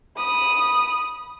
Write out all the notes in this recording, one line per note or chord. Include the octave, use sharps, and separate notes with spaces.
B5 D#6